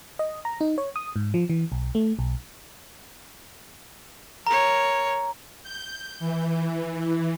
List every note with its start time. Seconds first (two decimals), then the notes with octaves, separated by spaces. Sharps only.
0.19 D#5
0.45 A#5
0.61 D#4
0.78 C#5
0.96 D#6
1.16 G#2
1.34 F3
1.50 E3
1.72 B1
1.95 A3
2.19 B1
4.47 A#4 C#5 A#5
5.63 G6
6.20 E3